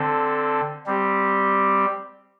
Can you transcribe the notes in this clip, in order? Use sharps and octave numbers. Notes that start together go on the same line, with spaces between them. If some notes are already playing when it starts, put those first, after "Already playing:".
Already playing: D3 C4 A4
G3 C4 G4